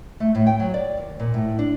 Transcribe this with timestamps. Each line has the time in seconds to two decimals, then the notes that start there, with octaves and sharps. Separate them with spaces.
0.20 A3
0.35 A2
0.47 G5
0.60 F#3
0.74 D5
0.97 D#2
1.19 A#2
1.34 A2
1.59 D4